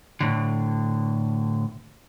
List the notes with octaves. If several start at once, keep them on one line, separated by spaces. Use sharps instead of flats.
A2 D3